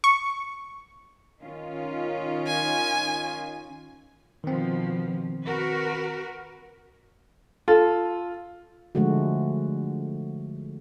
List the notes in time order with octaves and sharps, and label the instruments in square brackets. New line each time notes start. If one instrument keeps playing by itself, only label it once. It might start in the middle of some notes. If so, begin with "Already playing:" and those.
[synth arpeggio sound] C#6
[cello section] D#3 C#4 F4
[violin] G#5
[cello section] B2 F3 [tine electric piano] D#3 C4
[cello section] F#4 A#4 B4
[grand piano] F4 [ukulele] A4
[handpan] D3 F3 G#3 A3 F#4